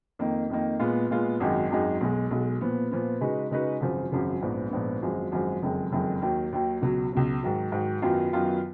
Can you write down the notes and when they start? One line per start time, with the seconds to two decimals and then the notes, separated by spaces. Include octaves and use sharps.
0.19 F2 D#3 A#3 D#4
0.50 F2 D#3 A#3 D#4
0.80 A#2 G#3 B3 F4
1.10 A#2 G#3 B3 F4
1.40 G#1 F#2 D#3 G#3 D#4
1.70 G#1 F#2 D#3 G#3 D#4
2.00 B1 B2 G#3
2.31 B1 B2 G#3
2.61 A#2 F3 B3
2.91 A#2 F3 B3
3.21 C#3 G#3 D#4 F#4 B4
3.51 C#3 G#3 D#4 F#4 B4
3.81 G#1 F#2 C#3 F3
4.11 G#1 F#2 C#3 F3
4.41 A#1 G#2 F3 B3
4.71 A#1 G#2 F3 B3
5.02 G#1 F#2 F3 G#3
5.32 G#1 F#2 F3 G#3
5.62 F#1 F2 D#3 G#3
5.92 F#1 F2 D#3 G#3
6.22 D#2 D#3 F#3
6.52 D#2 D#3 F#3
6.82 C#2 B2 F#3
7.12 C#2 B2 F#3
7.43 G#2 D#3 F#3
7.72 G#2 D#3 F#3
8.02 F#2 D#3 F#3 B3 F4
8.33 F#2 D#3 F#3 B3 F4